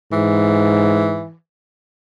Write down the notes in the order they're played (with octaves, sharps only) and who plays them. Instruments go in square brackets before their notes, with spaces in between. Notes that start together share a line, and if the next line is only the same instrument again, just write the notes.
[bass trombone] G#2 [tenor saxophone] E3